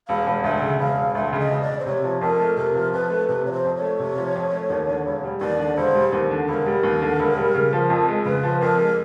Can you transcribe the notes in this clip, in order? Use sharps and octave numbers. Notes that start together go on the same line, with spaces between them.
E1 F5
E1
D2 E5
C#3
E1 F5
E1
D2 E5
C#3 E5
D#5
E1
D5
E1
C5
C3 C#5
F3
F2 A#4
A3
C3 A#4
F3
F2 B4
A3
C3 B4
F3 C#5
C5
F2
C#5
A3
C3
F3
F2
A3
D#2
D3
E1
G3
D#2 D5
D3
E1 C5
G3
D#2
D3
E1 A#4
G3
D#2
D3
E1
G3
C#3
F3
F2
G#3
C#3 B4
F3
F2 A#4
G#3